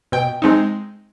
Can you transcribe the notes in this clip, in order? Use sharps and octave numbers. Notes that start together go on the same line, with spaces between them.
B2 G5
G#3 C4 D#4